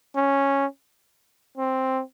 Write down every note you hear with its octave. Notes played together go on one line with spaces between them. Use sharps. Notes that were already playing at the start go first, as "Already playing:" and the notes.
C#4
C4